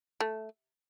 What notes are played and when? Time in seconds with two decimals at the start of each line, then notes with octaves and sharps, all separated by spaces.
0.20 A3